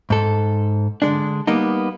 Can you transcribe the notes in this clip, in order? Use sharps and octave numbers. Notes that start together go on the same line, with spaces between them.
G#2 A4
D3 G#3 D4
G3 A#3 B3 D#4